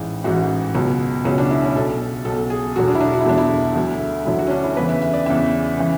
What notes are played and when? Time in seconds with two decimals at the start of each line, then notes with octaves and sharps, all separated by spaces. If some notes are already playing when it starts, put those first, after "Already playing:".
Already playing: A1 G#2 E3
0.24 A1 G#2 E3 F#4
0.75 C#2 B2 F#3
1.25 C#2 B2 F#3 C#4
1.38 D4
1.51 E4
1.63 C#4
1.75 B1 B2 F#3 A4
2.25 B1 B2 F#3 A4
2.50 G#4
2.76 E1 E2 D3 F#3 F#4
2.88 D4
2.95 E4
3.01 D4
3.13 F#4
3.21 E4
3.26 E1 E2 D3 F#3 D4
3.38 E4
3.75 D2 D3 F#3
4.25 D2 D3 F#3 E4
4.39 F#4
4.47 C#4
4.51 D4
4.64 E4
4.76 E2 C#3 E3 B4
4.89 E5
5.02 E5
5.13 D5
5.26 E2 C#3 E3 E5
5.78 C#3 E3